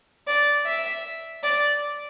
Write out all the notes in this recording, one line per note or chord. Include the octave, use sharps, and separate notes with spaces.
D5
E5
D5